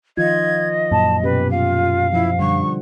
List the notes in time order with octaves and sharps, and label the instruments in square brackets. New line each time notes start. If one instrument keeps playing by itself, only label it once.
[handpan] D#3 F3 F4 [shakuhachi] D#5 [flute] G#6
[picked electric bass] F#2 A#2 [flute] A5
[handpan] B2 C#4 G4 [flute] B4
[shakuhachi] F4 [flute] F5
[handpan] F3 [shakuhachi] E4
[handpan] D3 G3 F#5 [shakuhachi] C#6